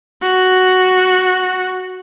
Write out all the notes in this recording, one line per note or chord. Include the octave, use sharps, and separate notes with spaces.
F#4